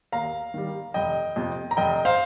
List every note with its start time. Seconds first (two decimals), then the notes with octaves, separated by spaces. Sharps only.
0.12 D#2 F5 A#5
0.54 D#3 G3
0.94 F1 D#5 G5
1.36 F2 C3
1.71 A#5
1.77 F1 D#5 G5
2.05 C5 F5